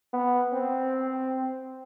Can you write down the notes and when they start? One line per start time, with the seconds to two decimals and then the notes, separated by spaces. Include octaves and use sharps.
0.13 B3
0.53 C4